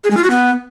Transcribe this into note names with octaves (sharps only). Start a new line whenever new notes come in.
G#4
G#3
F4
F#4
B3